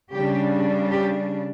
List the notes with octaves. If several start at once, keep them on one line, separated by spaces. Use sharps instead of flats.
C#3 G3 D4 G4
G4